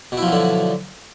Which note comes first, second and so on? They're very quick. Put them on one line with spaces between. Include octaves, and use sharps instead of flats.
B2 E4 F3 F#3 D3